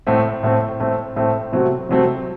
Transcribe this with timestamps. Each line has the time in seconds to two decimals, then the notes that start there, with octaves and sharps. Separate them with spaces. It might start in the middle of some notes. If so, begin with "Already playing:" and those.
0.07 A2 A3 C4
0.43 A2 A3 C4
0.80 A2 A3 C4
1.16 A2 A3 C4
1.52 C3 F#3 A3 C4
1.89 C3 F#3 A3 C4